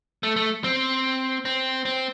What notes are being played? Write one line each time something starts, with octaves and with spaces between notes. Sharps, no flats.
A3
A3
C4
C4
C4